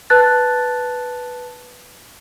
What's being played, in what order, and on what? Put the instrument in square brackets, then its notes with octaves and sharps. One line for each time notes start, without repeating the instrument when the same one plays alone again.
[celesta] B4 A5 F#6 A6